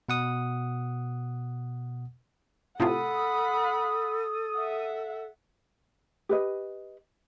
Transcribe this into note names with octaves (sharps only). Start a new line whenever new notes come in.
B2 F#5 D#6
A2 C3 F4 A4 F#5 B5 D#6
E5 F#5
G4 B4 D#5